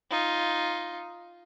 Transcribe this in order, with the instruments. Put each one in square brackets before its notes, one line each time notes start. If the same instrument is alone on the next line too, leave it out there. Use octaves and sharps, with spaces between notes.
[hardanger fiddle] D#4 F4